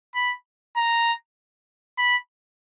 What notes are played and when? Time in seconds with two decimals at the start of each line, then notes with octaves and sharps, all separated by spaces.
0.15 B5
0.76 A#5
1.98 B5